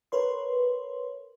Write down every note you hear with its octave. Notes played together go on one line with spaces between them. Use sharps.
A#4 B4 C#5 C6